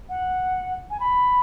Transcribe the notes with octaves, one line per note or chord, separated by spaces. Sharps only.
F#5
G#5
B5